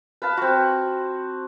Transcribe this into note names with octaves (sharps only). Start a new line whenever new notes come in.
B4 F5 A5
C4 F#4